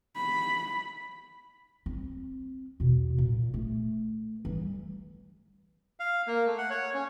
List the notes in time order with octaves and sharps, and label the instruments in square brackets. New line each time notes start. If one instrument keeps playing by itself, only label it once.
[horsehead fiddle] B5
[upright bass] C4
E2 B2
A#2
A3
E3 G3
[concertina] F5
A#3
A3
F#5
C#5
C#4